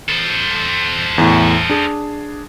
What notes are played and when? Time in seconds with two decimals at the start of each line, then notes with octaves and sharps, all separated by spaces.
0.09 A4 C5
1.18 E2 A2
1.70 D4 G#4